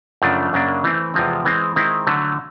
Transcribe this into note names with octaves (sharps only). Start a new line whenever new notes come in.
F#2 C#3 F3 A3 D4
F#2 C#3 F#3 A#3 D4
E3 A3 C4
E2 C3 F3 G#3 C4
E3 G#3 C4
D#3 G#3 C4 E4
D3 F#3 A3